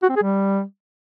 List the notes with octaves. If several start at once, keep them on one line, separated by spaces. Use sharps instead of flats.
F#4
C4
G#4
G3